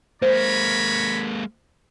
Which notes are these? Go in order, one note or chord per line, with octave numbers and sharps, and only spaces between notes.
G#3 A#3 C5 C#5 A#5 B5